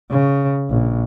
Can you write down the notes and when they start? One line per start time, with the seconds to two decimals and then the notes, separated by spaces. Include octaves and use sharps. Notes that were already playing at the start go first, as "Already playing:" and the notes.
0.11 C#3
0.69 A#1